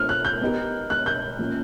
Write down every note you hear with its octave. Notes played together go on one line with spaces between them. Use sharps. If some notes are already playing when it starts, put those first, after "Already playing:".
Already playing: A3 D4 F4 C5 F6
F#6
G6
B3 D#4 G4 A#4
F#6
G6
A#2 F3 A#3 C#4